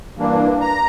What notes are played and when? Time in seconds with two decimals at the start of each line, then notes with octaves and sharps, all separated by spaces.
0.15 G2 E3 A#3 D4
0.61 A#5